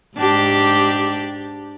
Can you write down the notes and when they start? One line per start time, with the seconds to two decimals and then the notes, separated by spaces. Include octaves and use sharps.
0.16 G#2 D4 G4